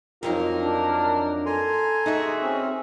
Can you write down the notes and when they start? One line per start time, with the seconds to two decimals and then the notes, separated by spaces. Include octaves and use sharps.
0.23 F2 F#3 A#3 D#4 F4 A#4
0.63 D4
1.46 A4 G#5 A#5 C6
2.06 D#2 D#4 F#4 G#4 E5
2.41 C4 C#4